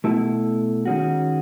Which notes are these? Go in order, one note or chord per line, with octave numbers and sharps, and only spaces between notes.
B2 A3 E4 A4
D#3 G#3 C#4 F#4